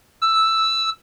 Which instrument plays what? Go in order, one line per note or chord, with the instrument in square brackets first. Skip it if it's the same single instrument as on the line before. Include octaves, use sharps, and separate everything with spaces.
[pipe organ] E6